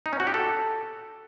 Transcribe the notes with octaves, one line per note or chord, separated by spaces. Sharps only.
D#4
C#4
F#4
G4
A4